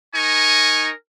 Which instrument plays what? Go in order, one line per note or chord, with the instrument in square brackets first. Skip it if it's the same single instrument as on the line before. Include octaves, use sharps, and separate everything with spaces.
[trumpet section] D#4 A#4 G#5 C#6